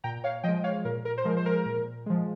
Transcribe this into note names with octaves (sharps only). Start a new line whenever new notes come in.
A#2 G5 A#5
C#5 F5
F3 G#3 D#5 G5
C#5 F5
A#2 A#4
A#4
C5
F3 G#3 A#4
C5
A#4
A#2
F3 G#3